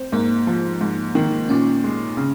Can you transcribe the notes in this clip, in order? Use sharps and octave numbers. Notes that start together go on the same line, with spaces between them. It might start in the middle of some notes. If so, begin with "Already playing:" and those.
Already playing: C4
G#2 A#3
F3
G#2
D#3
A#2 C#4
G#3
C#3